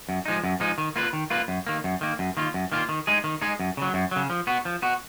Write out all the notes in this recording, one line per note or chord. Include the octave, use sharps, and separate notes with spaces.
F#2
F3 G#3 D#4
F#2
F3 G#3 D#4
D#3
A#3 F4 B4
D#3
A#3 F4 B4
F#2
D#3 A#3
F#2
D#3 A#3
F#2
D#3 A#3 F4
F#2
D#3 A#3 F4
D#3
G#3 D#4 G#4
D#3
G#3 D#4 G#4
F#2
C#3 F#3
F#2
C#3 F#3
F3
B3 F#4
F3
B3 F#4